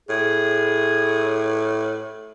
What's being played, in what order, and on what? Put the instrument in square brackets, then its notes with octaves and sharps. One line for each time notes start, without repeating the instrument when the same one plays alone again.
[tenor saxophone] A2 [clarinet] G#4